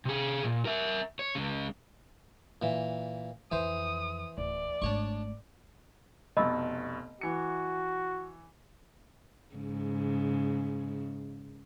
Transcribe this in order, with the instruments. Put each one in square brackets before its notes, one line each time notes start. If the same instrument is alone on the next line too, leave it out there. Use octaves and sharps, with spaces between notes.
[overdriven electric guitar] C3 G#4
A#2
A#4 E5
C#5
C#2 C#3
[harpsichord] A#2 E3
[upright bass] F2 [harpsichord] E3 C5 [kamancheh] D#6
[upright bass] D1 [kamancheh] D5
[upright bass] G#1 A3 [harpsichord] D4 C#5 C#6
[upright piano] F1 B2 [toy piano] D#5 B5 E6
[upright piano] E3 C#7 [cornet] F#4
[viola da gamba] G#2 C#3